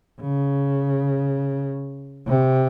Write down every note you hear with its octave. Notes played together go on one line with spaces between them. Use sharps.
C#3
C3